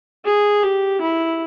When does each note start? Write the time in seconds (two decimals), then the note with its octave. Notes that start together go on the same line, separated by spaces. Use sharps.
0.24 G#4
0.63 G4
1.01 E4